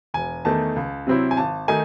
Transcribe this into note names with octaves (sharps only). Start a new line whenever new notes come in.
E1 G#5
E2 D#3 A3 A5
C#2
C3 F#3 C4 E4
G#5
G#1 A5
D#3 A3 D#4 G#5